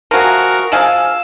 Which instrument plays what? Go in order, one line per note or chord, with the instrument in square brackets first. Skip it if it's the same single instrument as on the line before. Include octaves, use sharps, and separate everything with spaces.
[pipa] F3 A3 G#4 [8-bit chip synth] F#4 A#4
[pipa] F3 G#4 F5 [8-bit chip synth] E6